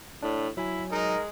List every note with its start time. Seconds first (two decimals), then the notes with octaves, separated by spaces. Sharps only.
0.22 A2 D4
0.57 F#3 E4 G#5
0.91 G#3 D#4 A#4